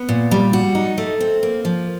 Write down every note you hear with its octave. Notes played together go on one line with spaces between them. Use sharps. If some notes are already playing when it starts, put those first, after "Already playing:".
Already playing: B3
A#2
G3
F#4
D#4
A3
C4
A#3
F3